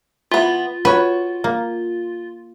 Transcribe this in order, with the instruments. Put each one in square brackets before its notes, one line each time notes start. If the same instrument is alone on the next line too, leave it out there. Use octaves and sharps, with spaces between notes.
[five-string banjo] E3 B3 [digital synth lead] F4
[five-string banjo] F#4 C#5 [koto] B4
[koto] A#3